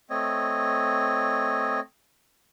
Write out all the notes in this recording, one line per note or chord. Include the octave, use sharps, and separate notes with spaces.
A3 C4 C#5 D#5